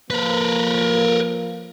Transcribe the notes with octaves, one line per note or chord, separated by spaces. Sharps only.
F3 A#3 A#4 B4